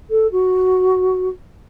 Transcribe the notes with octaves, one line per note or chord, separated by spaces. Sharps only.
A4
F#4